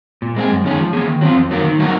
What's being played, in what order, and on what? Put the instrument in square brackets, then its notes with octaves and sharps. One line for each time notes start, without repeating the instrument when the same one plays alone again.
[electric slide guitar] A#2
G#3 C4 F4 G#4
F#2
D#3 G#3 C#4 G#4
F3
A#3 C#4 G#4
D#3
F#3 C4 F4
F2
D#3 F#3 A#3
D#3
F#3 A#3 D#4 F#4